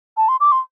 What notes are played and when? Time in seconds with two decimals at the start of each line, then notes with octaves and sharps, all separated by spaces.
0.17 A5
0.28 C6
0.40 D6
0.52 C6